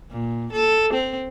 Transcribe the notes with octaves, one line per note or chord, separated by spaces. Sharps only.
A#2
A4
C4